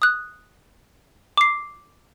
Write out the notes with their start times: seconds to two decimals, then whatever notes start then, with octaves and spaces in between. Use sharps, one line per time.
0.02 D#6 F#6
1.38 D6 C7